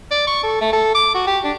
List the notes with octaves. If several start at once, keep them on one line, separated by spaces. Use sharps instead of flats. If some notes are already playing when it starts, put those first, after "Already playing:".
D5
C#6
A4
A3
A4
D6
F#4
G4
D4